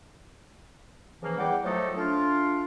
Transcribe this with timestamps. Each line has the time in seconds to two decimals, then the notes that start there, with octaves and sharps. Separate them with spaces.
1.22 C#3 E3 F3 A#3
1.38 E2 G3 F#5 G5 D6
1.64 F3 F#3 A3 D#4 A4
1.97 A3 D4 F4